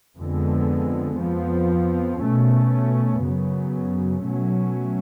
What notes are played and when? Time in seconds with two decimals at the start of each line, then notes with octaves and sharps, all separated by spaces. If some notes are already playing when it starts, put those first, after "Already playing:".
0.18 F2 D3 G#3 B3
1.19 F2 F3 B3
2.21 B2 A3 C#4
3.22 F#2 C#3 F#3 B3
4.23 B2 F#3 A3 C#4